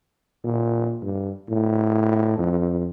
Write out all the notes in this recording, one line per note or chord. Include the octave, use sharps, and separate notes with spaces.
A#2
G2
A2
F2